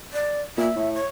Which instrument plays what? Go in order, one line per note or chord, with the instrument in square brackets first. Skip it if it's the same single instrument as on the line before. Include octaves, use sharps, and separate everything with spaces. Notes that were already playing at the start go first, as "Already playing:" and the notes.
[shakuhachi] D5
[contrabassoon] A#2 [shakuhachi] E5
[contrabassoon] A2
[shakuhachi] C#5